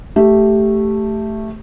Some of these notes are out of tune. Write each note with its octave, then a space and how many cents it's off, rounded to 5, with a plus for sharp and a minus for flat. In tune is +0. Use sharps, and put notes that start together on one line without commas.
A3 +0 G4 +0